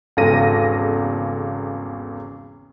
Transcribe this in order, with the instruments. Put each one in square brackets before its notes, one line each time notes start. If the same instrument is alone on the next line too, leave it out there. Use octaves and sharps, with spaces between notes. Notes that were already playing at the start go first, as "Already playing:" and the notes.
[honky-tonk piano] G#1 E2 C#3 A4 A#6 D#7